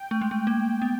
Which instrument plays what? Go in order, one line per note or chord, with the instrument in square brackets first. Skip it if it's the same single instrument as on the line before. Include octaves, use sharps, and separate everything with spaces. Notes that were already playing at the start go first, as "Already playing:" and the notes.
Already playing: [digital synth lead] G5
[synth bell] A3
G#3
A3
A#3
B3